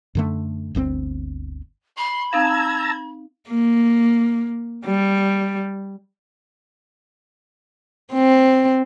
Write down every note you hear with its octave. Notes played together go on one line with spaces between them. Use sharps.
F#2 D3 A3
G1 D2 B2 C4
B5 C6
C4 D#4 F5 A5 A#5 E6 G#6
A#3
G3
C4